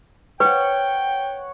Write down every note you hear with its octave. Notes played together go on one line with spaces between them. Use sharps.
B4 C#5 F#5 G5